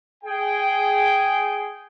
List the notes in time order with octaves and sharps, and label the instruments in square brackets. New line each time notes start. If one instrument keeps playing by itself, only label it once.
[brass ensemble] G#4 G5